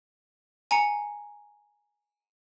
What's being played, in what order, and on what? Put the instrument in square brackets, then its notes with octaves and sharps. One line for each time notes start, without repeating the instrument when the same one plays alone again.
[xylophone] G#5 A#5 C#7